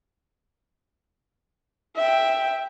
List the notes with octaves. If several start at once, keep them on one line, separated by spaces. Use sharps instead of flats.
E5 G5